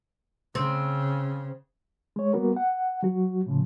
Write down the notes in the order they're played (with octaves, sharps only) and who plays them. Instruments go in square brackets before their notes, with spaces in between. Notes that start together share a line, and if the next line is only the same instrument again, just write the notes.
[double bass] C#3 [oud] C4
[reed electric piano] G#3 C#5
G3 A#3 B3 F#4 A#4
F#5
F#3 F#4
A2 C#3 F3